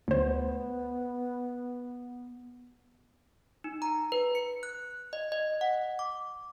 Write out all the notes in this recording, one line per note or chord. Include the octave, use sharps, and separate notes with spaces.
D2 B3 C5
D#4
A#5
B4
C#7
F#6
D#5
D#5
F#5
D6